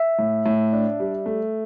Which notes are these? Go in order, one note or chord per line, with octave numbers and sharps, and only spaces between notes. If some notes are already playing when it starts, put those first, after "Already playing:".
Already playing: E5
A2
A2
D4
G3
A3